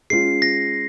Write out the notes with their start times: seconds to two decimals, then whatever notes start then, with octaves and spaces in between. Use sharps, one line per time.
0.10 G#3 C#4 F4 C7
0.42 A#6